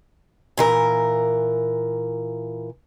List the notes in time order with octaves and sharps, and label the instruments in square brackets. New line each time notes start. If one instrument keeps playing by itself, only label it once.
[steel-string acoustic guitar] A#2 E3 A#4